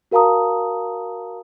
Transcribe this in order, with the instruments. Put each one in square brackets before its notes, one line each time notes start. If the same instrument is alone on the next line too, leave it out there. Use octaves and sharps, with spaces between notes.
[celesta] F#4 A#4 F5 A5 A#5 D#6